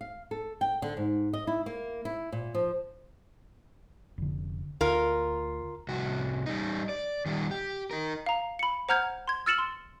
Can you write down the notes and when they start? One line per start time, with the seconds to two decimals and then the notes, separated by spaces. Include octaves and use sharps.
0.01 F5
0.31 A4
0.61 G5
0.82 D3
0.97 G#2
1.33 D#5
1.47 E4
1.66 A#3
2.05 E4
2.32 A#2
2.55 F3
4.18 F1 D3
4.81 D2 F4 A#4
5.88 C2 F#4
6.46 G3 D#4
6.89 D5
7.26 D#3 G3
7.51 G4
7.91 D#4 A#4
8.26 F5 A#5
8.59 B5 C#7
8.89 C5 F#5 A#5 F6 G6 G#6
9.28 C6 G#6
9.46 E6 F6 A6 C#7 E7 F#7
9.58 C6